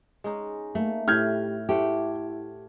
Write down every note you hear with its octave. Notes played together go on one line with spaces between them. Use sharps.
G#3 C#4 D#4
A3 A#3
A2 G4 B4 F6 G6 G#6
A3 E4 G4 C5 F#5